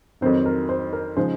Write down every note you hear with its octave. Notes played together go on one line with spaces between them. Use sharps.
F2 D#3 F#3 C4 D#4 C5
A#4
C5
A#4
C#3 F3 G#3 D#4 C5